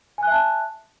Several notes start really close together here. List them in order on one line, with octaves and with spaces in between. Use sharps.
G#5 F#6 E5 A5